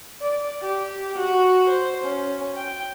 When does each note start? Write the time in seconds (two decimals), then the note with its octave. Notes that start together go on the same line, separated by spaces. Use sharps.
0.21 D5
0.62 G4
1.16 F#4
1.69 C5
2.04 C#4
2.57 G5